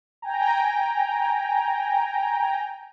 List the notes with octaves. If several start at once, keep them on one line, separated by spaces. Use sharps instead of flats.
G5 G#5 A#5